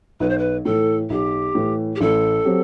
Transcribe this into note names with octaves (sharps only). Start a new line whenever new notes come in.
B1 B4
C5
B4
A2 E3 A4
B1 G4
A2 E3
G4
A1 A4
F#3 C4 G4